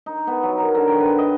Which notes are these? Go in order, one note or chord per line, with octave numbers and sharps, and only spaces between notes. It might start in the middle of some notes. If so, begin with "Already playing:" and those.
D#4
B3
F#3
A#4
D3
G5
B4
D#5